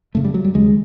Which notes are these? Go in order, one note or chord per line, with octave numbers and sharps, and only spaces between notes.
F#2 C#3 A3
G3
F#3
G3
D#2 C#3 G#3